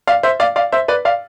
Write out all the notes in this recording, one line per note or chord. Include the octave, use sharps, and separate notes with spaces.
D5 F5
C5 E5
D5 F5
D5 F5
C5 E5
B4 D5
D5 F5